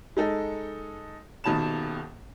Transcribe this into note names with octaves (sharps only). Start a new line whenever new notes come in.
G#3 D#4 A4
D#1 B2 D#3 A5 B5 E7